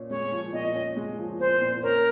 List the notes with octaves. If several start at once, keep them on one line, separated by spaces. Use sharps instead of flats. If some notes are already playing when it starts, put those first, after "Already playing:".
Already playing: A#2 C#4
G#3 C#5
F3
A#2 D#5
C#4
G#3
F3
A#2 C5
A#2
C#4 A#4